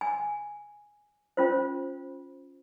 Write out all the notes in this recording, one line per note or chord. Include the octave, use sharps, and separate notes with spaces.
G#5
C#4 F4 C5